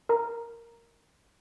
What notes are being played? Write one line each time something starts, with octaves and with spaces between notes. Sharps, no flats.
A#4 A#5